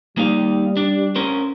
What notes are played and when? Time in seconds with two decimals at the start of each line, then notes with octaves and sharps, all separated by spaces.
0.17 G3 A#3 D#4 F5
0.77 D4
1.16 C#4 A#4 C5